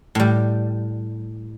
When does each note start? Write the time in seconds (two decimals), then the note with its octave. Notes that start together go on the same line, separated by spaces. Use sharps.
0.15 A2 G3